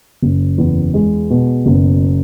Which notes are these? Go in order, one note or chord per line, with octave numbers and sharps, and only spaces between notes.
F#1
E2
G#3
B2
F#1